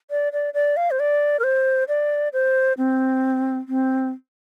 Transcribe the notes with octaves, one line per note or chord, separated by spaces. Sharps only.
D5
D5
D5
F5
C5
D5
A#4
C5
D5
C5
C4
C4